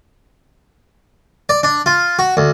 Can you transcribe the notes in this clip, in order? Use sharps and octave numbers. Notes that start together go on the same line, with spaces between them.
D5
D4
F4
F#4
D2